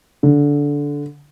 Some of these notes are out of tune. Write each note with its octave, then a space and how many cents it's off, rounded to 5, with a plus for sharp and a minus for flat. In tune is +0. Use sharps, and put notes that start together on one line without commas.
D3 -15